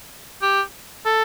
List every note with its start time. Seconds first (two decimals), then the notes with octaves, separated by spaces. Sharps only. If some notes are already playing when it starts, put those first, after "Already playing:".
0.42 G4
1.06 A4